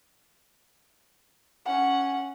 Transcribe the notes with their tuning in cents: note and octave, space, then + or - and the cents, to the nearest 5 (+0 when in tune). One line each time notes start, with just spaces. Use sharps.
C#4 +0 F#5 +0